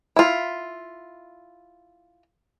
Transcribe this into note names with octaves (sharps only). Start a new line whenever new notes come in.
E4 F4